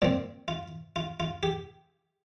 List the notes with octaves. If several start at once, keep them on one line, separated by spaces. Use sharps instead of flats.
A#2 F3 C4 D5
F4
F4
F4
G4